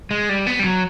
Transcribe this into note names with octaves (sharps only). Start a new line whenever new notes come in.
G#3
G3
B3
G3
F#3